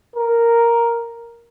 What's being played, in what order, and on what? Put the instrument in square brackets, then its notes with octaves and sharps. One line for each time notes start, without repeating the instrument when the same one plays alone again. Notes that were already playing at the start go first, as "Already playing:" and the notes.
[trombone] A#4